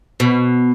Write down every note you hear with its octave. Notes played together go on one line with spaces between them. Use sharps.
B2